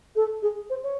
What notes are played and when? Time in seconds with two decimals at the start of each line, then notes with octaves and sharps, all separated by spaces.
0.16 A4
0.42 G#4
0.70 C5
0.83 C#5